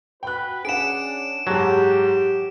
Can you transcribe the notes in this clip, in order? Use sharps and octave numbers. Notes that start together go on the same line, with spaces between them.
F#4 B4 G5 F#6
C#4 D4 G#4 F#5 D7 E7
G#2 F#3 G4 A5